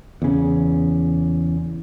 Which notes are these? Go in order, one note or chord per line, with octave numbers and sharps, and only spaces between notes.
E2 C#3